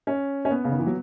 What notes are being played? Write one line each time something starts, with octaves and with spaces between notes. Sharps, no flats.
C#4
C#4
B3
C#3
D#3
E3
F#3